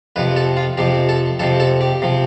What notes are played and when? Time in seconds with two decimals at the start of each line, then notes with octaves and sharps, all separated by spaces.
0.16 F2 C3 F3 B4
0.36 A4
0.57 F4
0.77 F2 C3 F3 G4
1.09 A4
1.39 F2 C3 F3 A4
1.60 A4
1.81 G4
2.02 C3 F3